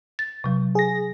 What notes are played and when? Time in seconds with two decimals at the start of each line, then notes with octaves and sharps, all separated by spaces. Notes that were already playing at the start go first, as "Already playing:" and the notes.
0.19 A6
0.44 C3 F#3
0.75 G#4 A#6